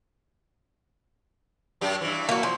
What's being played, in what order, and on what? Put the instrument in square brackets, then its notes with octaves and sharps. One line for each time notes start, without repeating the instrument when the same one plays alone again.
[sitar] F#2 G4
G2 E3
[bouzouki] A#3 F#4
F3